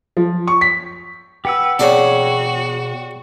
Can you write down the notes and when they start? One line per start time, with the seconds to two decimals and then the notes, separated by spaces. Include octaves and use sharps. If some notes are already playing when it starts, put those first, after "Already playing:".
0.17 F3
0.47 C#6
0.61 B6
1.45 G4 B4 F#5 E6
1.79 B2 F#4 G#4 C#5 D5 A5 B5